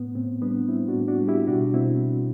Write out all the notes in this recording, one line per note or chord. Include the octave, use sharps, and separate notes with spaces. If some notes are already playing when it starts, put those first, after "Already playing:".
Already playing: A2 B3
A2 C4
G3 B3 D4
G3 C4 E4
D4 F#4
A2
D4 F#4
G3
E4 G4
B2 D4 F#4
B2 C4 E4